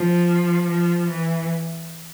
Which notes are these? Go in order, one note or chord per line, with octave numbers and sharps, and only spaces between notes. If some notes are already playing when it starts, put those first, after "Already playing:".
Already playing: F3
F3
E3